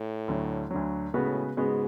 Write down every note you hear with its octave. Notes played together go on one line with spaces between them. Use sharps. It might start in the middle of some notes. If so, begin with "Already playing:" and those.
Already playing: A2
D2 D3 F#3
D2 D3 F#3
A2 C#3 G#3 B3 F#4 B4
G#2 C#3 G#3 B3 F#4 B4